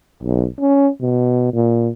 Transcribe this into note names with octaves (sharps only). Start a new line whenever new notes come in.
B1
C#4
B2
A#2